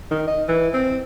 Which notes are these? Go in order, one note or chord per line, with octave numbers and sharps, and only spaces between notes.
D#3
D#5
E3
C4